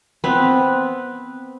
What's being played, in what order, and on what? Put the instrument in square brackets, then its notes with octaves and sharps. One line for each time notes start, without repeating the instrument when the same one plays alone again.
[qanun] B3 C4 B4